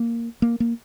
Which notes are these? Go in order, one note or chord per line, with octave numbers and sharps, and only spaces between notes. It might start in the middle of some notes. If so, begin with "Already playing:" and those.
Already playing: A#3
A#3
A#3